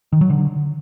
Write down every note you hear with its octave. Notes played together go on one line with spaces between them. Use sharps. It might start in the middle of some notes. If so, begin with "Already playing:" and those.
D#3
F#3
D3